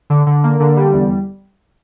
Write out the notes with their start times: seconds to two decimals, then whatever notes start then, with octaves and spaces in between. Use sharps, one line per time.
0.10 D3
0.27 D3
0.44 A#3
0.60 D3
0.77 G3
0.93 E2